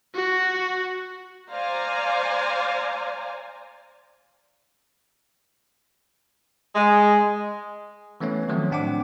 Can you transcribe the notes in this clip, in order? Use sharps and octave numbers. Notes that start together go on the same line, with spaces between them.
F#4
C5 D5 F5 G#5 A#5
G#3
E3 A3 B3 C#4 C#5
D#3 F3 F#3 A3 C4
A2 C4 D4 F#5 G5 D6